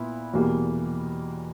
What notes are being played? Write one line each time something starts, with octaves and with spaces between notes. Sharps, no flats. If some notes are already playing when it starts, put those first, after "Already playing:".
Already playing: A#2 B3 E4
E2 B2 G3 A#3